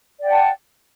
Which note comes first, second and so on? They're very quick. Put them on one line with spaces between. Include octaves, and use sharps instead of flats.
D5 G5 F#5 A5